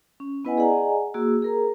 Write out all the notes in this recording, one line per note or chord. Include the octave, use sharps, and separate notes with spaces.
C#4
B3 E4 B4 D#5 F#5 G#5
G#4 D5 D#5 F#5 G#5 A#5
A#3 F#4 G#4 E6
G#4 A#4 A#5